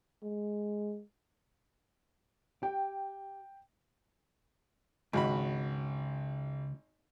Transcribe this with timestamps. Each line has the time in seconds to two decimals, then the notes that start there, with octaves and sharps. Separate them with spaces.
0.23 G#3
2.63 G4 G5
5.13 G#1 C#2 F#4 B5